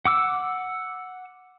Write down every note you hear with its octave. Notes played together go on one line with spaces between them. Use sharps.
F#5 D6 E6